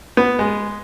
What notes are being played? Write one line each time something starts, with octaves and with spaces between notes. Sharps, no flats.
B3
G#3